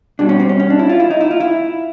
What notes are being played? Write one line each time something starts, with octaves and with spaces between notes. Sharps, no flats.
B2 G3 D4
C#4
C4
C#4
C#4
D4
E4
F4
E4
D#4
E4
F4
E4